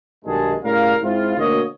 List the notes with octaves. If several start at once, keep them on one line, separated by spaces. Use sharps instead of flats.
B1 G2 D#3 G#3 G#4 A5
A2 C#3 G3 A#4 F5
G#2 C4 E4 F4
D2 B2 A#3 C#5 D#5